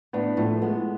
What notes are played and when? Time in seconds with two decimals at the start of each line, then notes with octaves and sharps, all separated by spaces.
0.13 A2 B3 D4
0.37 A2 F3 A3
0.56 A3
0.62 G#3 B3